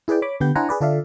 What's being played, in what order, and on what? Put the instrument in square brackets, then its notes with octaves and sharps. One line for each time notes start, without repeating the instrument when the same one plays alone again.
[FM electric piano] E4 G#4 B4 D5 G5
C#5 B5 D6
D3 B3 G4 B4 G6
D4 E4 C5 F#5 G#5 A#5
G#4 B4 D5
D3 F4 A4 D5 E5 F5